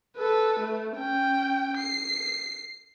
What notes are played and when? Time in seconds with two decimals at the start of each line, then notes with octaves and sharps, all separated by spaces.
0.16 A4 B4
0.60 A3
0.97 C#4 G5
1.78 C7